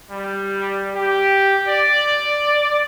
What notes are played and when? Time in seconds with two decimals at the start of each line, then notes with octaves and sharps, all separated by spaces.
0.11 G3
0.95 G4
1.69 D5